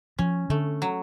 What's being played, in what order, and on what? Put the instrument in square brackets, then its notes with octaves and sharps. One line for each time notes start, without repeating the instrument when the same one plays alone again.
[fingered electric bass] F3 [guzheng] C#4
[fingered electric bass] D3 [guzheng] A3
[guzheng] F#3